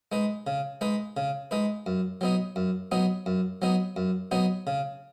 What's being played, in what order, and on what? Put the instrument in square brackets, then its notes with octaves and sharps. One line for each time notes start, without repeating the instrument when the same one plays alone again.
[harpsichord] G#3 D#4 B4
C#3
G#3 D#4 B4
C#3
G#3 D#4 B4
F#2
F#3 B3 D#4
F#2
F#3 B3 D#4
F#2
F#3 B3 D#4
F#2
F#3 B3 D#4
C#3